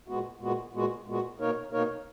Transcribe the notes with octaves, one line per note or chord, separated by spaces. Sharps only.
A#2 G#3 B3 F#4
A#2 G#3 B3 F#4
A#2 G#3 B3 F#4
A#2 G#3 B3 F#4
B2 A#3 D#4 A#4 C#5
B2 A#3 D#4 A#4 C#5